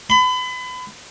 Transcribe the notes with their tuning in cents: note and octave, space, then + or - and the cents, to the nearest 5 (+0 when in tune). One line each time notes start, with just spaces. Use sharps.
B5 +35